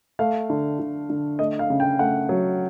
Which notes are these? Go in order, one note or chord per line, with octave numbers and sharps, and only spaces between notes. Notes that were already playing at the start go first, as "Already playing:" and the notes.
A3 F5
D3
D3
D3
A3 D#5
F5
C#3
G5
A3 F#5
F#3